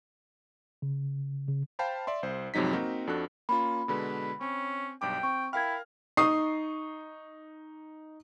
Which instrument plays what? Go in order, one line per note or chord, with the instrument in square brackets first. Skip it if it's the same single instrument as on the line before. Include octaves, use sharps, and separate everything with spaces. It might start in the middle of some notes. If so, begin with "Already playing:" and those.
[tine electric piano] C#3
C#3
[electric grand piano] C5 F5 G5 A5 B5
D5 E5 C6
C2 C5
F2 G#2 C3 F#3 D#4 B6
A#3 C4 D#4 F#4 A#4
F2 D4 F#4 A4 F#6
[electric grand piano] A#3 C#4 F4 [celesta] B5
[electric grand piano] B2 D3 G#3 [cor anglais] B4
[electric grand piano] C4 [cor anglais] C#4
[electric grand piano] B1 G2 D6 [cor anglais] G5
[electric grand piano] C4 [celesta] C#6
[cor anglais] E4 [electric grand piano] A#4 F5 F6 [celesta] G5 G#6
[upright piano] D#4 C#6 D#6 C7